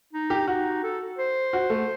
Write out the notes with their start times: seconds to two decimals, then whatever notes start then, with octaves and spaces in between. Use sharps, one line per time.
0.13 D#4
0.30 G4
0.47 D#4 F#4
0.83 A4
1.18 C5
1.53 F#4
1.70 A3